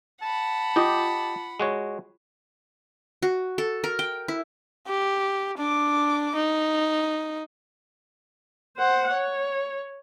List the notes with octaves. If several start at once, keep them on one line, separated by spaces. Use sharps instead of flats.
F#5 A5 B5
F4 G4 D#5 G5 D6
G#3 F#4 C#5
F#4
A4
A#4
G5
E4
G4
D4 D6
D#4
C5 F#5
C#5